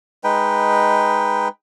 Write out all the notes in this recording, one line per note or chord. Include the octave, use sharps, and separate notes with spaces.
G#3 D#4 B4 G5